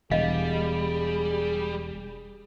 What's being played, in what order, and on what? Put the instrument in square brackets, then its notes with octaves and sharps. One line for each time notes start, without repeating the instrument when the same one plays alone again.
[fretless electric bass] E1 [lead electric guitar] G3 [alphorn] G#4 [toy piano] D#5 F5